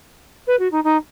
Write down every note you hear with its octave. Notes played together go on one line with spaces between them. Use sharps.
B4
F#4
D#4
D#4